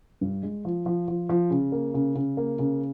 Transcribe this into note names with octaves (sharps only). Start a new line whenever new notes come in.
G2
G#3
F3
F3
F3
F3
C#3
A#3
C#3
C#3
A#3
C#3